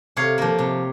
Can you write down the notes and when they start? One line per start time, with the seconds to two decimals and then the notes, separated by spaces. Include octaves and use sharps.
0.17 C3 C#5 F5
0.38 F3 A#3
0.59 C3